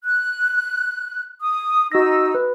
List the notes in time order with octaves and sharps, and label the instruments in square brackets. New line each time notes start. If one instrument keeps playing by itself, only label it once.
[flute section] F#6
D#6
[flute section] D#4 E6 [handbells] F#4 A#6
[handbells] B4